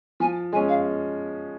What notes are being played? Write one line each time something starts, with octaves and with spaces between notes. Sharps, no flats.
F3 G#5
G#3 C#4 G#5
F5